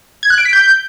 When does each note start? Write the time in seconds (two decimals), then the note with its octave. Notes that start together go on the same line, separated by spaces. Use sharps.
0.23 G#6
0.30 F#6
0.38 D7
0.45 B6
0.53 G6